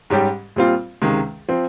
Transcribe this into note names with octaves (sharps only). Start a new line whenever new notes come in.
G#2 G3 C#4 G4
A#2 G3 C4 F4
C#2 C3 D#3 G#3
F3 C4